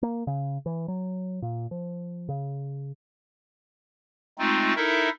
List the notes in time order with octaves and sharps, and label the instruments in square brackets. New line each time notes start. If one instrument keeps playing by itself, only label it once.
[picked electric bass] A#3
C#3
E3
F#3
A#2
F3
C#3
[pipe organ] G#3 A3 C4 D#4 F4
D#4 E4 A4 A#4 E5